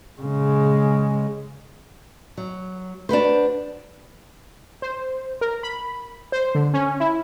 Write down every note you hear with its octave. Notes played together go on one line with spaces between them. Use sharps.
C#3 G#3
F#3
D4 F#4 B4 C5
C5
A#4
B5
C5
D3
C#4
E4